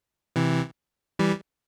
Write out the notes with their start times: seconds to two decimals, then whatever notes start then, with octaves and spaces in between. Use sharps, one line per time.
0.36 C3 E3
1.19 E3 G3